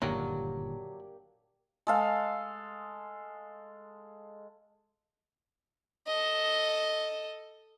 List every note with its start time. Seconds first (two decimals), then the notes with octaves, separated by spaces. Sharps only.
0.02 G1 F#2 A#2 D#3 F#3 A#3 D4 G4
1.87 G#3 A4 F5
6.07 A4 D#5